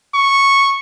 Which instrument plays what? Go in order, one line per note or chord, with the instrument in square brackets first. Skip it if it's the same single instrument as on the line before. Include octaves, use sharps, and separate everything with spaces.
[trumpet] C#6